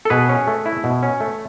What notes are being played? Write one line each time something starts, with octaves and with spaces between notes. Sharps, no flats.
A4
B2 G#4 B4
C#4
A3
E4
B2
C#4
A3